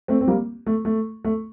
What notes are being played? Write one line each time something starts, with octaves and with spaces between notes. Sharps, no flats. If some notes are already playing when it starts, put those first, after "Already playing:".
A3 C4
C4
G3 A#3
A3
A3
A3